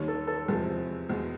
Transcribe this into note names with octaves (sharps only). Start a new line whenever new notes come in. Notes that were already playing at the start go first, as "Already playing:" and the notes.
Already playing: D#2 D#3 G3 C#5
A4
A4
E2 C3 F3 G#3 A4
E2 B2 G#3